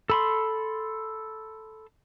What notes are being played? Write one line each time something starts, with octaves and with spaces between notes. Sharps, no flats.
A4 B5 C6